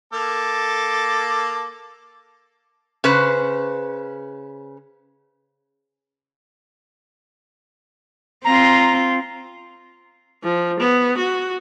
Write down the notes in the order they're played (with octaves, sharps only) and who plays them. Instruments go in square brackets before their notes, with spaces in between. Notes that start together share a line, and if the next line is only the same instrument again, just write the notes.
[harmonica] A#3 A4 D6
[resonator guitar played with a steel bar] C#3 B4 C5
[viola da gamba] C4 F4 [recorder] A#5
[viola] F3
B3
F#4